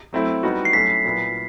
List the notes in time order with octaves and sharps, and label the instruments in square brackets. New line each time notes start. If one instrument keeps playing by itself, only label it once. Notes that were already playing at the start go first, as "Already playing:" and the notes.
[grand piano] F#3 A3 C4 E4
G3 B3 D#4 F#4
[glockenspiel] C7
[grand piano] F#3 A3 C#4 E4 [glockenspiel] B6
[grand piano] A#2 F#3 B3 E4